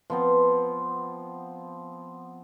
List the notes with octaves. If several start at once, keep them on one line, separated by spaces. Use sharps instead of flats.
F3 B3 C4